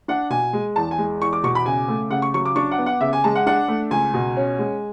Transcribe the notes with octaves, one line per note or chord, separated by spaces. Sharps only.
D4 F#5
B2 G#5
G#3
E2 A5
G#5
G#3
E2 C#6
D6
B2 C#6
B5
C#3 G#5
A3
C#3 F#5
C#6
F#3 C#6
D6
D4 C#6
F#5
B3
F#5
C#3 E5
G#5
G#3 A5
F#5
D4 F#5
A3
C#2 G#5
B2
C#4
G#3